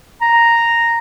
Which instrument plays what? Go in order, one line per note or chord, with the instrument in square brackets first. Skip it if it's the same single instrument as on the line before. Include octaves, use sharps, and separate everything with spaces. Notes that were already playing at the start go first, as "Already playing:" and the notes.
[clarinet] A#5